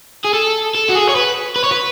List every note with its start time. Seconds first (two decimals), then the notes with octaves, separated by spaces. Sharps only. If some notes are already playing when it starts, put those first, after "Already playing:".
0.24 G#4
0.33 A4
0.75 A4
0.89 F#4
0.95 G#4
1.09 C#5
1.16 B4
1.56 B4
1.64 C#5
1.72 B4